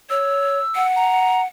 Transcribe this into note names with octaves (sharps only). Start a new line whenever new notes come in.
C#5 E6
F#5
A#5